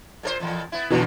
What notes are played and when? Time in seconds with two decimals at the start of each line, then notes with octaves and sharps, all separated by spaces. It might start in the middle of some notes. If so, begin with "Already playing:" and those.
0.23 A#2 A4 C5
0.40 F2 A#2 E3
0.72 B3 E4
0.90 F#2 B2 D3 E3 F3